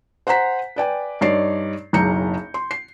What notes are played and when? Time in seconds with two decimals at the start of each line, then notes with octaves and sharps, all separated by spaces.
0.27 C5 F#5 G#5 A#5 B6
0.76 B4 D5 G5 G#5
1.21 G2 D#4 C#5 D5 C7
1.93 F#1 B1 G#4 A#5 G6 C#7
2.54 C6
2.71 C7